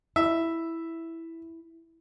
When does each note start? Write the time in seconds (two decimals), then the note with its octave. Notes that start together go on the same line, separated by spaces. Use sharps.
0.16 E4 E5